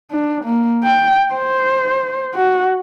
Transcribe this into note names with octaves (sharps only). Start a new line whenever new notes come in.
D4
A#3
G5
C5
F#4